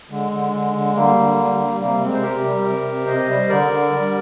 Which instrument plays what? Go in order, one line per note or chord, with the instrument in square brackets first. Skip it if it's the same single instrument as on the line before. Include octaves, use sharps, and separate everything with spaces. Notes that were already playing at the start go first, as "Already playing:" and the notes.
[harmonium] D3 G#3
D3
D3
D3
D3 G3 A#3
D3
G3
G3
C3 G3 A#3
C3 G#3 C4
C5
C3 G4 A#4
G3
C3
C3
C3 C5 D#5
G3
D3 A#4 D5
D3
G3